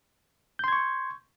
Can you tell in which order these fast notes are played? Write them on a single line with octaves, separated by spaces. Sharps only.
G6 C6 G#6 C#6